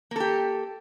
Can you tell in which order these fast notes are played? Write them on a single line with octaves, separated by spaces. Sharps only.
A#3 A4 G4